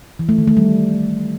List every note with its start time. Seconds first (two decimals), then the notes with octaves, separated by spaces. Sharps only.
0.19 E3
0.29 A3
0.38 D#3
0.47 A3
0.57 G3